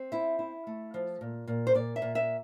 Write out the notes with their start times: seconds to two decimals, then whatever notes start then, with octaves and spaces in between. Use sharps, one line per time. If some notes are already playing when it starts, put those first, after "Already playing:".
Already playing: C4
0.12 E4 E5
0.39 E4
0.67 A3
0.94 F3
1.21 A#2
1.47 A#2
1.67 C5
1.75 A#2 D5
1.96 E5
2.02 A#2
2.15 E5